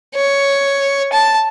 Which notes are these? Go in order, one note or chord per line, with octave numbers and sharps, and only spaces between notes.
C#5
A5